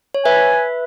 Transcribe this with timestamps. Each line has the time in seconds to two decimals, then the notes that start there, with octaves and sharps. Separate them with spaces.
0.14 C#5
0.24 B4 E5 G#5